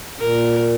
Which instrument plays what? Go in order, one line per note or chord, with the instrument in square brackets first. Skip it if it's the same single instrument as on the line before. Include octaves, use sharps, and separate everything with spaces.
[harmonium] A#2 [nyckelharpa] A#4